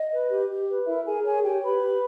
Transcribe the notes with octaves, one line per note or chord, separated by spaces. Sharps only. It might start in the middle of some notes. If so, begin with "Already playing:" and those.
Already playing: D#5
B4
G4
G4
B4
E4 A#4 E5
G#4 A#4 G#5
G#4 C#5 G#5
G4 C#5 G5
G4 B4 B5
G4